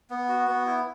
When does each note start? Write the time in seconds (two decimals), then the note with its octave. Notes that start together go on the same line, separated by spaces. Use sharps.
0.10 B3
0.29 F#4
0.48 B3
0.67 E4